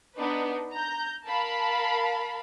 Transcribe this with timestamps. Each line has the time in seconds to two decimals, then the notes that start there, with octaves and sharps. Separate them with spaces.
0.16 B3 D4 D#4 B4
0.75 A#5 G6
1.27 A#4 F5 A5 B5